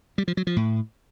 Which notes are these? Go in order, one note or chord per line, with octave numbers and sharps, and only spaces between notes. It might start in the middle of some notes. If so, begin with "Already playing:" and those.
G3
F3
F#3
F3
A2